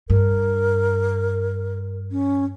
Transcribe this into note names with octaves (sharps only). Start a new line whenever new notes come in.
G2 A#4
C#4